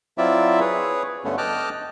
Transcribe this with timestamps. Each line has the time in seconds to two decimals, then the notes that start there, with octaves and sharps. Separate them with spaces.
0.18 F#3 C4 E4 F4 D5 E5
0.60 G#4 B4 C#5
1.25 G2 D3 A3 B3 C#4
1.38 D#5 G5 A5 D6 F6 F#6